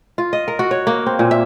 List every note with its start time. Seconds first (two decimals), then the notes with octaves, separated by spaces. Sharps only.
0.18 F4
0.33 D#5
0.48 A#4
0.59 F#4
0.71 C#5
0.87 A#3
1.06 C4
1.19 A#2
1.31 E5